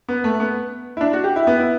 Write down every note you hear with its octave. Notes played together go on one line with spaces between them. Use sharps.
B3
A3
B3
E4
D4
F#4
G4
E4
B3
E4